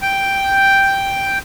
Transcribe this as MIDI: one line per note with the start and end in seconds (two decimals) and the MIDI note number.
0.02 1.38 79